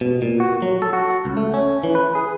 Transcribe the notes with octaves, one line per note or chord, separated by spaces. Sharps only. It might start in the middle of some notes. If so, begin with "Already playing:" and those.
B2
A#2
F#4
F#3
A4
F#4
C#2
A3
C#4
E3
B4
G#4